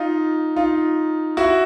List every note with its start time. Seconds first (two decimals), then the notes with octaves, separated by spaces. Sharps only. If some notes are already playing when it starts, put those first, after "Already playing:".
Already playing: D#4 F4
0.56 D#4 F4
1.37 E4 F#4